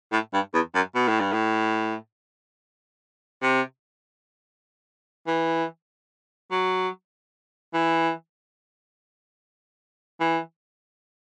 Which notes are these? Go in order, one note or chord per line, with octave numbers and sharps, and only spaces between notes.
A2
G2
E2
F#2
B2
A2
G2
A2
C3
E3
F#3
E3
E3